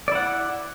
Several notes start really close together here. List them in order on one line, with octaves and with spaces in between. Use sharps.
D5 E4 F#5